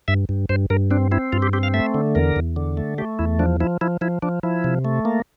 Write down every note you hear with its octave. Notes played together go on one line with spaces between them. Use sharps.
G2 E5
G2
G2 C5
G2 A#4
C4 D4
C4 E4
G2 F4
G4
C4 G4
F5
A3 E5
D3
E2 A#4
E2
D3
A3
A3 G4
E2 E4
F3 D4
F3 E4
F3 E4
F3 E4
F3 D4
F3 E4
C3
A3
A#3